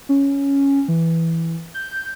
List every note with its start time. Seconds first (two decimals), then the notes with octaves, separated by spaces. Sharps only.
0.09 C#4
0.88 E3
1.74 G6